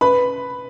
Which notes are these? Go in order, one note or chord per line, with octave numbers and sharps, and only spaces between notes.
B4 B5